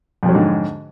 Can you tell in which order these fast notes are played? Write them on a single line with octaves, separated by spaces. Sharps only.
F2 F3 F#3 D3 G#2